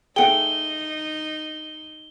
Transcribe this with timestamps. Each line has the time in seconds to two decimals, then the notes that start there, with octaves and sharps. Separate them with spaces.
0.16 A3 D#4 G#4 F#5 G5 G7